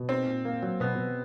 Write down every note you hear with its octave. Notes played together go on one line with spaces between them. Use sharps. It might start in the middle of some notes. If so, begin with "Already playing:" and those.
Already playing: B2
C4 D#4
A#2
A#3
F#3
B2 B3
B2